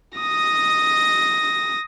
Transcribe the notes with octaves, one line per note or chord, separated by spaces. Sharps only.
D#6 A#6